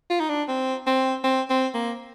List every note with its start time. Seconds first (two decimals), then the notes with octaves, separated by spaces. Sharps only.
0.10 F4
0.20 D#4
0.29 D4
0.48 C4
0.87 C4
1.24 C4
1.50 C4
1.74 A#3